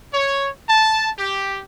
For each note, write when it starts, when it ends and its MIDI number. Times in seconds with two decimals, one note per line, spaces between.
0.14 0.50 73
0.68 1.10 81
1.18 1.60 67